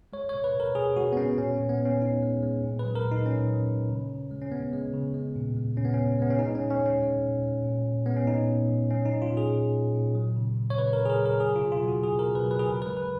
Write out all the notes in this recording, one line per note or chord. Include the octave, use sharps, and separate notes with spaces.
G#3 C#5
C#5
B2
B4
B2
A#4
B2 G#4
G#3 F#4
B3
G#3 C#4
A#2 C#4
B3
A#2
B3
A#2
C#4
G#3 D#4
G#3
G#3
A#2
B4
F#3
A#4
A#2
D#4
A#2 C#4
F#3
A#2
C#3
C#3
G#3
C#4
G#3 B3
G#3
C#3
G#3
A#2
G#3
A#2 C#4
B3
A#2 C#4
G#3 B3
C#4
G#3 D#4
C#4
A#2
C#4
G#3 C#4
G#3
A#2
G#3
A#2
A#2
G#3 B3
C#4
A#2 D#4
A#2
F3
F#3 C#4
D#4
A#2
F4
A#2 G#4
A#2
A#2
A#2
F#3
C#3
C#3
C#5
C#3 B4
A#4
C#3
G#4
A#4
F#3
A#4
F#3 G#4
F4
B2
F4
F#3
F#4
F#3 G#4
B2 A#4
B4
F#3
B4
G#4
C#3 A#4
G#3 B4
B4